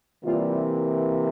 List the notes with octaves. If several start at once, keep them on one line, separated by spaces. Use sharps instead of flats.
C3 E3 G3 A#3 F4